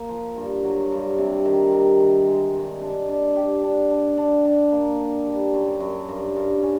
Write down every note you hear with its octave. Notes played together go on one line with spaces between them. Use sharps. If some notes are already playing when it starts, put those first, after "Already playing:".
Already playing: A#3
F3
G2
F#3
G2
C3
D#3
C3
D#3
G#3
G2
D4
D4
G4
D4
D4
D4
D4
A#3
D4
G3
F#2
F#2
G2
G2
C#4